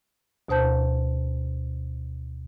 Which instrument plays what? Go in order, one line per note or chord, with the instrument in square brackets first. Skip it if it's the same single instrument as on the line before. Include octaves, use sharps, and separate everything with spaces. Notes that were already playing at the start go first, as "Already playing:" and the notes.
[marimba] D2 B2 C5 A5 G6